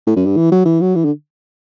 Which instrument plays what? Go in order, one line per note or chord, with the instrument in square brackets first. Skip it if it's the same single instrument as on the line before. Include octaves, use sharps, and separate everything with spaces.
[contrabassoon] A2
F#2
G2
E3
F#3
E3
F#3
E3
D3